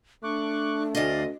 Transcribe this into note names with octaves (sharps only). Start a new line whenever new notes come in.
A3 D4 C#6 D6 F#6
D2 D5 D#5 F5